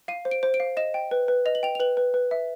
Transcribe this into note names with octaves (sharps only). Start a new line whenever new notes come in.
F5 D#7
C5
D7
C5
D7
F5
D#5 E7
G5
B4
B4
D#5 F7
F#7
G5 F7
F7
B4 F#7
B4
B4
E5